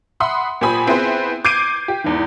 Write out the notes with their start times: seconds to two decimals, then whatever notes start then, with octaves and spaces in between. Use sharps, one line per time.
0.20 E5 F#5 B5 C6 D#6
0.61 A#2 G4 C5 G#5 B5 D#6
0.87 B3 C4 E4 G#4 B4 C5
1.45 D6 G6 G#6 C7 D7 D#7
1.88 G4
2.04 E2 G#2 E3